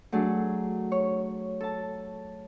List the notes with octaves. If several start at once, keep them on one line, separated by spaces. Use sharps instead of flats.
F#3 A3 D4 G#4
C#5
A4 A5